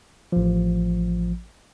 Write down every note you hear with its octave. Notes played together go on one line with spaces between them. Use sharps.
A1 F3